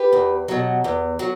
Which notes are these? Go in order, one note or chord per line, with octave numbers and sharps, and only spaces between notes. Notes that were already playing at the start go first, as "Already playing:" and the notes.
Already playing: G4 B4
E2
B2 F#3
E2
F#3